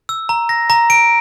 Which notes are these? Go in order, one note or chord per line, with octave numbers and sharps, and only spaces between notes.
E6
A#5
A#6
A#5
D7